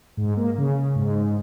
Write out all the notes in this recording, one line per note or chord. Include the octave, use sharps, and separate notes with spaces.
G#2
A#3
C#3
G#2